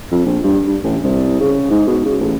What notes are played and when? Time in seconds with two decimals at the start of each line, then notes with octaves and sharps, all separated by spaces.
0.12 F2
0.26 A#1
0.44 G2
0.68 G2
0.84 A1
1.04 C2
1.40 C#3
1.71 G#2
1.87 B2
2.05 C#3
2.21 A1